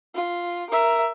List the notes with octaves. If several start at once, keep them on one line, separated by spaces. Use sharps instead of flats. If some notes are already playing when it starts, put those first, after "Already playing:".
F4
A#4 E5